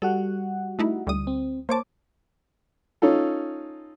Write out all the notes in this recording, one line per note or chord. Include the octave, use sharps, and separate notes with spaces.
G3 F#4 A4 F#5
A3 D#4 E4
D2 G3 D#6
C4
A#3 C5 C#5 A5 D6
C#4 D#4 F4 A4